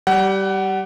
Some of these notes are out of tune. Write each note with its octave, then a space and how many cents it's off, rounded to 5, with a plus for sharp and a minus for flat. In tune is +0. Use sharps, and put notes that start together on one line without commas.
G3 -15 F#5 +25